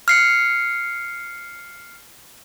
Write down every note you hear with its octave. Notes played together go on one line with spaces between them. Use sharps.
F6 C7 C#7